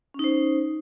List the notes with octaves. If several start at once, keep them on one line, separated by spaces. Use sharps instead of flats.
C#4 D#4 C5